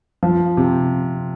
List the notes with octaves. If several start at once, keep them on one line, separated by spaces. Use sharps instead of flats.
F3
C3